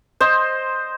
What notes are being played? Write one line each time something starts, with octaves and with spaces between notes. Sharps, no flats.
C5 D#5